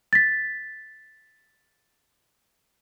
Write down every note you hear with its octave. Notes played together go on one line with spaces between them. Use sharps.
A6 B6